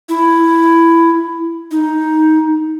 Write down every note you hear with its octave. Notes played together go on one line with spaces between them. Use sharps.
E4
D#4